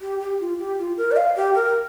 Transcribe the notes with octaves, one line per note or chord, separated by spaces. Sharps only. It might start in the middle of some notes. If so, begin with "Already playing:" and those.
G4
G4
F4
G4
F4
A#4
D5
F5
G4
A#4